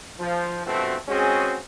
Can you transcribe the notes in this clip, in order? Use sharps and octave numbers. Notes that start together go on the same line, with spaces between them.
F3
G2 B2 F3 A3 C4 F#4
G#3 C4 C#4 F#4 G#4